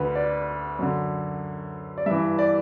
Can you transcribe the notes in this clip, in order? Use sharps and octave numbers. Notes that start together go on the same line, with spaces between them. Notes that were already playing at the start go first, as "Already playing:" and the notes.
Already playing: D2 D3 B4
D5
F#2 D3
D5
G2 E3 E5
D5